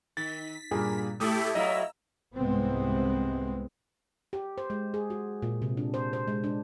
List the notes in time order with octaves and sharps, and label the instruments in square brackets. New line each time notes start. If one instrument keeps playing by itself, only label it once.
[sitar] D#3 [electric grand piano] A6 [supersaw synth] B6
[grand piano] G2 A#2 G#4 [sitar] A#3
[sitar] A2 E4 [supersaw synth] A3 G4 A4 [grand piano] D#6
[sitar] A2 F#3 E4 [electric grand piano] D#5 F5 [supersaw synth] A#5 E6
[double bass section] C2 G#2 C3 G#3 B3 C4
[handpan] G4
C5
G#3
G#4
F#4
A#2
C3
D4
C5
C5
G#3
D4